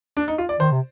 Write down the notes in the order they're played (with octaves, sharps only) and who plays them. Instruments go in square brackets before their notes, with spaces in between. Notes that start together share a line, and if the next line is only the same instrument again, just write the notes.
[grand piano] D4
D#4
F4
D5
[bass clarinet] D#3 [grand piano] C5
[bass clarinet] C3